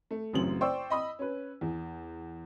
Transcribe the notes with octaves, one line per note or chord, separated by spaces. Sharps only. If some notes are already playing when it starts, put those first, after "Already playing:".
A3
A1 F#2 C#3 C4 F#7
C5 D5 G5 C#6 E6
D#5 B5 D#6
C#4 B4
E2